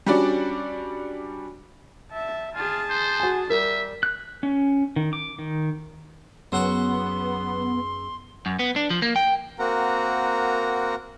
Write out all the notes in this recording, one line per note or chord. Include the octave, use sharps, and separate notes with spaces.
G3 C#4 D4 F#4 D5
E5 A5
F4 G#4 A5
C5
F#4 G#5
G3 A#4 E5
F#6
C#4
D#3
D6
D#3
F#2 F#3 B3 G#4 F#5 C6 C#6 E6
F#2
B3
D4
F3
A#3
G5
A#3 C4 F#4 A#4 F#5 A#5